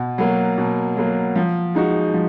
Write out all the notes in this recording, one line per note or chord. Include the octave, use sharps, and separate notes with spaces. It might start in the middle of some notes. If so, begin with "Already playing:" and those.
Already playing: B2
F#3 A#3
B2
F#3 A#3
F3
G#3 D#4 F#4
F3